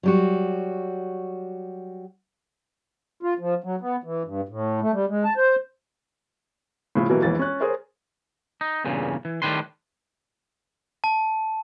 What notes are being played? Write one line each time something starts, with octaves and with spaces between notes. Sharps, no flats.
F#3 G3 F#4
F4
F3
F#3
B3
E3
G2
A2
A3
G3
G#3
A5
C5
A2 C#3 F3
B2 E3 F#3 G3 A#3
E1 A#1 E3 A6
C#4 F#6
G#4 A#4 C5 C#5
D#4
E2 G2 A#2 C#3
E3
A2 D#3 G3 B4 C6
A5